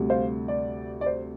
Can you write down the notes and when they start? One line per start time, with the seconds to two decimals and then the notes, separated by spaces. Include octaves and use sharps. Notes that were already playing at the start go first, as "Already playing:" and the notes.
Already playing: D2 C3 G3
0.10 C5 F5
0.48 D5
1.01 D5
1.06 C5